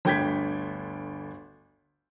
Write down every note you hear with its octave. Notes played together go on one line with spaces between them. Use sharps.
G1 D2 G5 G6 G#6 B6